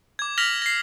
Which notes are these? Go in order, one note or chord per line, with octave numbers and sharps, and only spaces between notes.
D6 G#6
F6 A#6 B6 F7 F#7
A#6 C7